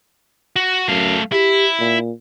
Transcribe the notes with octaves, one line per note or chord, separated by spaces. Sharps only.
F#4
F#2 A3 F5
E4 G4
A#2